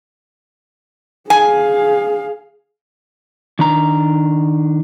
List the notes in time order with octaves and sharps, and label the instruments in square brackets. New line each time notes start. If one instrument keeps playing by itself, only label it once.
[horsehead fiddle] G#4 F5 [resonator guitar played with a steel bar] G#5
[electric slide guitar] D#3 D4 A#5